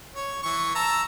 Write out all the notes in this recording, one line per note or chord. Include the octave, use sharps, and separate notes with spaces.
C#5
E3 C#6
A5 A#5 E6